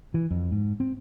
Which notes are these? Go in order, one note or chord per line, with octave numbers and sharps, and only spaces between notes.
E3
F2
G#2
C4